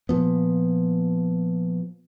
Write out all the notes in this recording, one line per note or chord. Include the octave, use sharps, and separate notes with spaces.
A#2 F3 B3